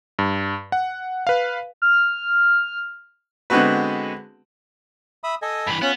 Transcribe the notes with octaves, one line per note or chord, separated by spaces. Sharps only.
G2
F#5
B4 F5
F6
D3 G#3 B3 C4 F#4 B4
E5 B5 D#6
A4 D#5 G#5
G2 E3 B5
B3 C#4 F4 F#6